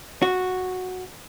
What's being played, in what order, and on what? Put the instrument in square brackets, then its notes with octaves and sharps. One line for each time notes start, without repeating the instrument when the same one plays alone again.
[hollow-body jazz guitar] F#4